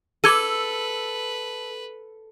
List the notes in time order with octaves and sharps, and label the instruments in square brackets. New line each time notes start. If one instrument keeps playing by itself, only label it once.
[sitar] A4 [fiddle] B4 [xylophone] D6 G#6 D#7